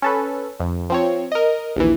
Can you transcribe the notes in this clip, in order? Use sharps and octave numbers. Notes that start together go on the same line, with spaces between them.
C#4 A4 B4
F2
F3 C4 C#5
A#4 D#5
A#1 D#2 E3